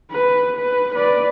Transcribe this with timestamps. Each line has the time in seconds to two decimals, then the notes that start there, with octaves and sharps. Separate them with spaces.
0.11 B4
0.56 B4
0.96 B4 D5